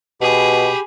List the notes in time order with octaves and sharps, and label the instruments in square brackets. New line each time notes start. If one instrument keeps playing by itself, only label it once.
[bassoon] B2 [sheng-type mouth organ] G4 B5 [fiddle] G#4